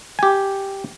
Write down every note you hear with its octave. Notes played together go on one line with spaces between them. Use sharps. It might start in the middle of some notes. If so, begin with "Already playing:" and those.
G4 G#5